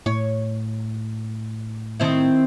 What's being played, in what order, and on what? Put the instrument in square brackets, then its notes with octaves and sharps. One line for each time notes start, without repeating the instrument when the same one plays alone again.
[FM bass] A2 [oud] C#5
[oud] D#3 C4 E4